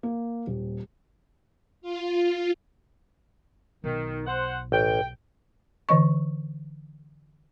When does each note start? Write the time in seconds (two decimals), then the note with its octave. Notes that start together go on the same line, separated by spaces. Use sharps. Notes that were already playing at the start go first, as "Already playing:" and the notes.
0.03 A#3
0.47 D#1
1.82 F4
3.84 B1 D#3
4.26 C5 F#5
4.72 A1 G5
5.89 D3 E3 D#5 C#6